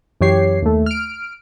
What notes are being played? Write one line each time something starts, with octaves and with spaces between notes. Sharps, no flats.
F#2 E3 G4 C#5 C7
D#2 A3
F6 D7